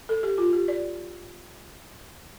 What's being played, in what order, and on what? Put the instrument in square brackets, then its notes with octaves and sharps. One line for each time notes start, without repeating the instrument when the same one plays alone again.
[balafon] A4
G4
F4
G4
D5